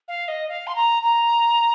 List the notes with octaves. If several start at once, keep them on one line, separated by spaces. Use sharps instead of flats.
F5
D#5
F5
C6
A#5
A#5